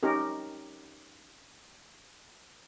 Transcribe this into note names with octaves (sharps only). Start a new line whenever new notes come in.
C#4 D#4 G4 A#4